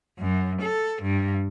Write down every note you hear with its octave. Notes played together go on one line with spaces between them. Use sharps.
F#2
A4
G2